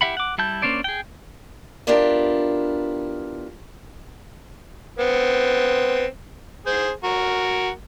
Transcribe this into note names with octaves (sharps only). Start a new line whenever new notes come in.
E4 G4 E5 F#5 B5
F#5 D6
G3 E4 A5 G6
A#3 C#4 D4 C5 D5
G#4 G5
B3 D4 E4 F4 G4 A#4
B3 C4
G#4 C5
F#4 A#4